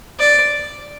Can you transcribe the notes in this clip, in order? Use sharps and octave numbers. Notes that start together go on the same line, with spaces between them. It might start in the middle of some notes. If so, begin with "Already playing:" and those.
D5